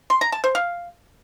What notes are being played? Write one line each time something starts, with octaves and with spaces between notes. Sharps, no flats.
C6
A#5
A5
C5
F5